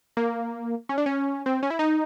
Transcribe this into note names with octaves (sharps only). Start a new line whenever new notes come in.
A#3
C#4
D4
C#4
C4
C#4
E4
D#4